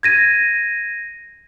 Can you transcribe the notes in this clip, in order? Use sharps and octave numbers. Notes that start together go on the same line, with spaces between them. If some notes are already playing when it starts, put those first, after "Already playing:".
G#6 A#6 D#7